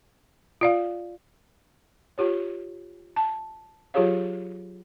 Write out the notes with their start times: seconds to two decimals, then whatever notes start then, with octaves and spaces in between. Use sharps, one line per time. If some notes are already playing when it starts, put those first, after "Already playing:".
0.61 F4 D5 F5
2.18 F4 G4 C#5
3.16 A5
3.94 F#3 F4 G4 G#4 C#5 F5